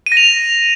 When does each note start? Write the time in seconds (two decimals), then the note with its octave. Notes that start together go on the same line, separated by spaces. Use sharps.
0.06 D#7
0.12 A#6
0.17 F7